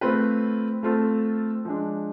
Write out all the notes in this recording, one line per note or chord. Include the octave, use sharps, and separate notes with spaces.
A3 C4 F4 B4
A3 C4 F4 A4
F3 G#3 D4